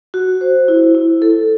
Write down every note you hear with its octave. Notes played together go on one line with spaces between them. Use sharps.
F#4
C5
E4
E4
A4